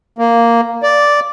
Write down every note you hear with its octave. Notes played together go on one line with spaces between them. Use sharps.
A#3
D5